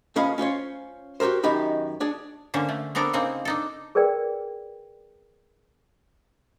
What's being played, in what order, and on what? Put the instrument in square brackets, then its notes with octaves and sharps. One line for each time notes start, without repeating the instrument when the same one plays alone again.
[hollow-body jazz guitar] D#2 F3 C#4 D#5 F5 B5
C#4 F4 C5 C#5
F#4 G4 A4 A#4 C5
F#2 D#3 D#4 G4 B5
D4 G#4 C#5 D5
[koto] D3 A#3 C#4 C5
A3
B3 C4 D4 A4 A#4
C#3 A#3 C4 D#4
D4 D#4 A4
[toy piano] G#4 A#4 B4 D5 G5